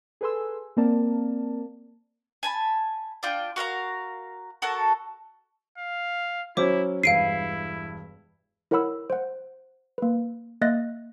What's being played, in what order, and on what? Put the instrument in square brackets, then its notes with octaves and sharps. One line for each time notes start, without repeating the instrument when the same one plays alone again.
[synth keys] G#4 A4 B4 G#5 C6 E6
A#3 C4 A#4 D5 A5
[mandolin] G#5 A5 B5
D4 F4 G5
F#4 A#4 F5 A#5
F#4 A4 A#4 A5
[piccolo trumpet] F5
[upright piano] F#3 C#4 [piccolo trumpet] E4 [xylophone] C5 C#5 D6
[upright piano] E1 G2 [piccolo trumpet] E4 [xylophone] F5 D7 D#7 [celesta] C7
[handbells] E4 A#4 C#5 F#5 B5 E6
C5 F#5
A#3 B4
A#3 D#5 E5 F#6 A6 A#6